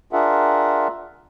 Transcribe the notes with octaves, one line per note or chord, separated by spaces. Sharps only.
D4 F4 G#4 A#4 E5 F#5